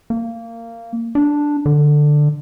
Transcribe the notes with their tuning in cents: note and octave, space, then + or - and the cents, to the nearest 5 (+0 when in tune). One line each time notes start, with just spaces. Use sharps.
A#3 -20
D4 +0
D3 +10